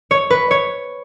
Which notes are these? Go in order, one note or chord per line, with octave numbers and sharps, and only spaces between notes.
C#5
B4
C#5